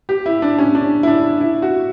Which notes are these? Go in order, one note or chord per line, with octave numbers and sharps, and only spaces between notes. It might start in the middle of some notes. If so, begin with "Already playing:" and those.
G4
E4
D4
C#4
D4
E4
D4
E4
F#4